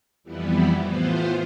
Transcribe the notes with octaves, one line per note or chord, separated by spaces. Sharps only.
F2 E3 G3 B3 E4
A2 E3 B3 F4 C5